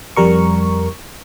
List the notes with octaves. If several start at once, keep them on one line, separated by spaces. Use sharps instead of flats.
F2 G3 A#4 C#6